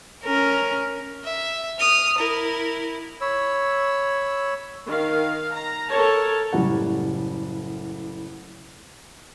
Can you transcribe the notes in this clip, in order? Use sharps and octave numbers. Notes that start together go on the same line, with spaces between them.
C#4 A#4
E5
D#6 F6
E4 A#4
C#5 B5 E6
D#3 F5
A#5
A4 A#4 C#5 A5
F#1 A2 G3 F#5